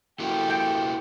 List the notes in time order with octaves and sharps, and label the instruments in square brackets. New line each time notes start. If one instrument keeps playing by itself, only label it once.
[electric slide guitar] E4 F#4 A#4 [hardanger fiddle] G4 A4
[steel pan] G5